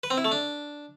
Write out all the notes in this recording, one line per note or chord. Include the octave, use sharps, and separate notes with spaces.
B4
C4
E4
A3
D4